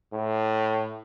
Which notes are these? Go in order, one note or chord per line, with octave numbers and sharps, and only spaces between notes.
A2